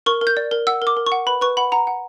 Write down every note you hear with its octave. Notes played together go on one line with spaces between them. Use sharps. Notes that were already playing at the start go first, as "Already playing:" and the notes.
A#4 C#6
A#4
G6
D5
A#4
F#5 E6
A#4 D6
A#4
C#6
F#5
B4 B5
B4 C#6
F#5 B5
F#5 A#5
F#5